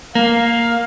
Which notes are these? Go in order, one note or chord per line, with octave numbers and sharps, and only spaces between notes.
A#3 F5